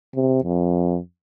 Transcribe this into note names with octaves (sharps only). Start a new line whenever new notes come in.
C3
F2